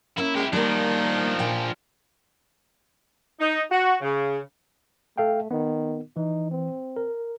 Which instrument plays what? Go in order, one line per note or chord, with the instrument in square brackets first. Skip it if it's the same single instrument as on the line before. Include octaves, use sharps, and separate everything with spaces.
[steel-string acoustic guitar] A#3 C#4 [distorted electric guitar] E4
[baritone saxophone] G#3 [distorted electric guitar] E4 G4
[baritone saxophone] D#3 [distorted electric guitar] F3 D4 [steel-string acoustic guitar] G3 A#3
[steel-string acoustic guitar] A#2 G5 G#5
[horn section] D#4
F#4
C#3
[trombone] A3 [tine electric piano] A4 F5 G5
[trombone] D#3 [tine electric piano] B3
[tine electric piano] E3 [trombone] D#4
[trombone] C4
[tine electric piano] A#4